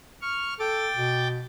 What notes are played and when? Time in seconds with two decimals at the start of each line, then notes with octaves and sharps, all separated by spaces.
0.22 C#6 F6
0.59 A4 G5 D6 A6
0.95 B2